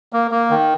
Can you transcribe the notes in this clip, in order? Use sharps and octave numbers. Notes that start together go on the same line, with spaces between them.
A#3
A#3
D#3